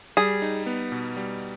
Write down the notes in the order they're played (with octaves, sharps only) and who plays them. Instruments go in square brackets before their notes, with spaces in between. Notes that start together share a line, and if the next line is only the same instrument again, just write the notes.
[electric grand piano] G3 [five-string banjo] G#4
[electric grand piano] D#4
B3
B2
G3